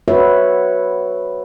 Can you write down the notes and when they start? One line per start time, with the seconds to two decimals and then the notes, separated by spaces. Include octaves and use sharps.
0.08 F#4 B4 C#5 E5